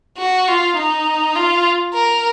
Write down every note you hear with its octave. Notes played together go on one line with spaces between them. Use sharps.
F#4
F4
D#4
F4
A#4